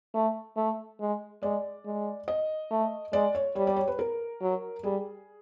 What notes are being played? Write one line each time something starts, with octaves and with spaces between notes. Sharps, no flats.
A3
A3
G#3
G#3 D5
G#3
D#5
A3
G#3 D5
C#5
G3 C#5
D5
C#5
B4
A#4
F#3
G3 G#4